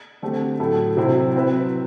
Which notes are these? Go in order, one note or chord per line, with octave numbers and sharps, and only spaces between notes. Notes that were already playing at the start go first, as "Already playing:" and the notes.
D3 A3 C4 G4
A2 F#3 A3 E4 A4
C3 F#3 C4 E4
F#3 C4 E4 B4 E5